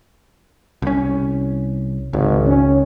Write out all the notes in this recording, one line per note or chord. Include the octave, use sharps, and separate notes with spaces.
C2 C#4
G#1 C#2
C#4